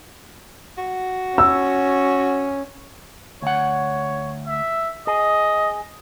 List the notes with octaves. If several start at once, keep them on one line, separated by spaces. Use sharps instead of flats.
F#4
C#4 E6
D2 C#5 F#5
E5
G#4 D#5